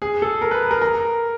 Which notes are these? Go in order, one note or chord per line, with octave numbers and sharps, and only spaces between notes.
G#4
A4
A#4
B4
A#4
A#4